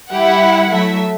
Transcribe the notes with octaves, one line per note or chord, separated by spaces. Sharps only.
G3 E4 G4 F#5
F#3 A3 E5